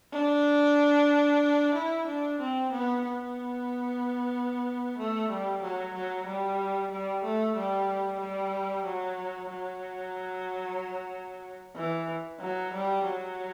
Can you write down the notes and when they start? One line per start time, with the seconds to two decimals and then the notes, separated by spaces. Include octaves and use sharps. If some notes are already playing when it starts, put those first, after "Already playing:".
0.13 D4
1.74 E4
2.07 D4
2.40 C4
2.72 B3
3.04 B3
4.98 A3
5.30 G3
5.62 F#3
5.94 F#3
6.26 G3
6.91 G3
7.24 A3
7.56 G3
8.20 G3
8.86 F#3
9.50 F#3
11.76 E3
12.40 F#3
12.73 G3
13.05 F#3